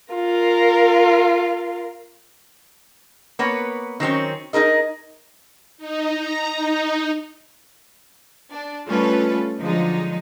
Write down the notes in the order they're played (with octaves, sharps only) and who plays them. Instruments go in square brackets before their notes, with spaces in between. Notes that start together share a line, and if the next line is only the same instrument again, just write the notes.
[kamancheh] F4 A#4
[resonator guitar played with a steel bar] A#3 B3 B4 C#5
D#3 F#3 C4 C#4
D#4 G#4 A#4 D#5
[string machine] D#4
A#5
D#4
[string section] D4
G3 A3 C#4 F4 A4 B4
D3 F3 F#3 G#3 D#4